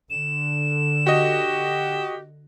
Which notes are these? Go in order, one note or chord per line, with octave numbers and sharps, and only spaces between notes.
D3 E7
F#4 G4 D#5